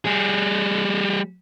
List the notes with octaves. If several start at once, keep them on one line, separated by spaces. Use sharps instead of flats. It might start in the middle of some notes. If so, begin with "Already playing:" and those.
G3 G#4